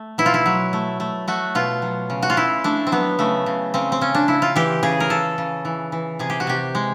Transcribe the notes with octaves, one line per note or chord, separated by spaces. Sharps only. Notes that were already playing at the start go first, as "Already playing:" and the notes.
Already playing: A3
B2 E4
F4
E4
F#3
A3
A3
A3 F#4
B2 F4
F#3
C#3
F#4
F4
C#3 E4
A3 D4
C4
F#3 B3
C#3 A3
C#3
C#3 C4
C4
C#3 C#4
D4
C#3 E4
F4
E3 G4
C#3 G#4
A#4
C#3 A4
C#3
E3
E3
C3 G#4
G4
F#4
C3 G4
G#3